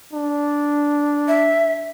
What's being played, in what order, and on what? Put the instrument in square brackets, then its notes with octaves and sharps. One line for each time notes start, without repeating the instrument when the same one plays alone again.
[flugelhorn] D4
[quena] E5